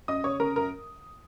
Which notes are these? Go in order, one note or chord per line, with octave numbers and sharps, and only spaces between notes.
F#2 D#5 D#6
C#3 C#5 C#6
C#3 A#4 A#5
F#2 A#4 A#5